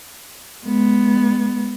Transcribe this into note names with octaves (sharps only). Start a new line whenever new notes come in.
G#3 B3